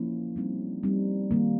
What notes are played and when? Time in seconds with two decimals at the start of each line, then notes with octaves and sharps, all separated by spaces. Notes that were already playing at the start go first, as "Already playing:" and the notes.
Already playing: F3 A#3 C#4 E4
0.36 G3 C4 D#4
0.83 G3 C4 D#4
1.31 D#3 G3 A#3